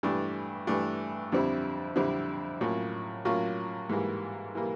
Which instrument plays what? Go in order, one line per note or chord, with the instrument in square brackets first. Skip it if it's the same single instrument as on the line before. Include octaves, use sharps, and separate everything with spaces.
[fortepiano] G2 E3 A3 D4
G2 E3 A3 D4
F2 D3 G3 C4 E4
F2 D3 G3 C4 E4
A2 F#3 A#3 C#4 F4
A2 F#3 A#3 C#4 F4
G#2 E3 G3 A#3
E3 G3 A#3